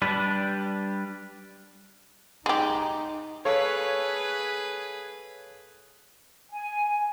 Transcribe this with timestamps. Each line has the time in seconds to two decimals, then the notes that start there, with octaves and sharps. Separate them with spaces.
0.02 G3 D4 B4
2.46 G#3 D#4 G4
3.45 G#4 A4 B4 C#5 F5
6.50 G#5